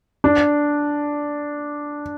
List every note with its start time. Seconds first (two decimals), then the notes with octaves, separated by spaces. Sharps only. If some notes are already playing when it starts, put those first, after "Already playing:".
0.24 D4